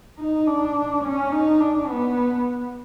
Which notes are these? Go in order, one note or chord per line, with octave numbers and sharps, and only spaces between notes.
D#4
D4
C#4
D#4
D4
B3